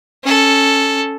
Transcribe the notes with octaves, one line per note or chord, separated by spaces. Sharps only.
C#4 A4